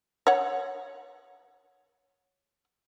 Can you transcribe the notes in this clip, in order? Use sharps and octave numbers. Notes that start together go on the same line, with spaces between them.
C#5 F#5